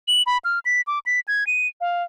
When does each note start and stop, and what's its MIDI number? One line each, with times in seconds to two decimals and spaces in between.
0.08 0.23 102
0.27 0.38 83
0.45 0.59 89
0.65 0.81 95
0.87 0.99 86
1.06 1.20 95
1.28 1.47 92
1.47 1.67 99
1.81 2.03 77